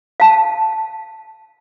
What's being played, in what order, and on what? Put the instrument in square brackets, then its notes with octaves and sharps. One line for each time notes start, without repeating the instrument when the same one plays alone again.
[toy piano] F5 A5